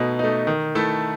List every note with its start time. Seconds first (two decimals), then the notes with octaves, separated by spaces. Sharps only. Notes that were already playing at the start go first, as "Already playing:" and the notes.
Already playing: B2 A3 D#4
0.19 A3 D#4
0.47 D#3
0.75 A3 E4 A4